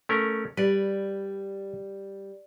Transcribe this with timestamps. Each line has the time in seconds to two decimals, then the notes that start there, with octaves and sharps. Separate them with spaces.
0.09 A3 C#4 A#4
0.57 G3 B4 D5